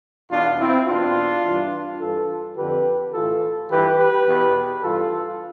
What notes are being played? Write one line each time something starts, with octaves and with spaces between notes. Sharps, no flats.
E2 B2 D4 F4
C4 E4
E2 B2 D4 F4
G2 E3
G2 E3 F4 A4
F2 D3 G4 B4
A2 E3 F4 A4
G2 E3 G4 B4
G4 B4
E2 B2
G2 E3 F4 A4